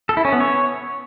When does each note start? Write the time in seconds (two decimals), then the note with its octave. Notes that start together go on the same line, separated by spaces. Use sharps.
0.09 A4
0.17 E4
0.25 C#4
0.33 B3
0.40 C#5